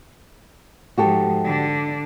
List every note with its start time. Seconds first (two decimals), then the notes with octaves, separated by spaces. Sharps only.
0.98 G#2 F3 F#4 G4 A4
1.45 D3 D4